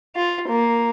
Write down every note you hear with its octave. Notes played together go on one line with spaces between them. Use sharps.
F4
A#3